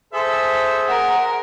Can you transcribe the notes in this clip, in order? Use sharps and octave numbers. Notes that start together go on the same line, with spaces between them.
G#4 A4 C5 E5
A#4 F#5